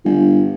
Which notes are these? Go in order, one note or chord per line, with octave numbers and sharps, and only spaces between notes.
G1